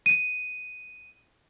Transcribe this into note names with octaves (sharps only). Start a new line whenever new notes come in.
D#7